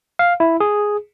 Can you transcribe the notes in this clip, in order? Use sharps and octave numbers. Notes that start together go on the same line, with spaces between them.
F5
E4
G#4